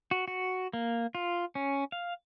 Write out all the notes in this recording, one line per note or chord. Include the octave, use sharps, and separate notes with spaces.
F#4
F#4
A#3
F4
C#4
F5